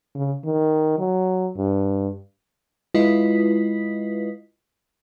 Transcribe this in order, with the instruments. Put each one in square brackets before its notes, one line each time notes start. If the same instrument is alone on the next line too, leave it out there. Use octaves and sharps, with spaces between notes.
[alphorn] C#3
D#3
F#3
G2
[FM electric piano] G#3 E4 F4 B4 D#5 B6